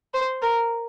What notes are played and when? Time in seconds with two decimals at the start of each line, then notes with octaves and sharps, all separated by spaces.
0.14 C5
0.42 A#4